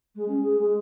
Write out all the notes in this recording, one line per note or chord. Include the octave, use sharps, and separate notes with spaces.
G#3
C#4
G#4
G#3